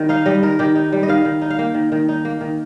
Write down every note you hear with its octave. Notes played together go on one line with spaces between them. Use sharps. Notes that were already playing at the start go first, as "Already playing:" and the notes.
Already playing: D#3 G3
D#4 F5
G3 D#5
D#3 A#4
D#3 G4
D#4
G3
D#5
D#3 F5
D#3
D#4
F5
A#3 G5
D#3
D#3
D#4
A#3
D#3